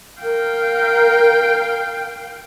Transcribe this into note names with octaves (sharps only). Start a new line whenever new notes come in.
A#4 F5 G5